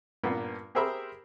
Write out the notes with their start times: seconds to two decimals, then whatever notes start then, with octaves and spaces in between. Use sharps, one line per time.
0.23 G2 A#2 A#3 B3
0.75 G4 G#4 A#4 C5 E5 B5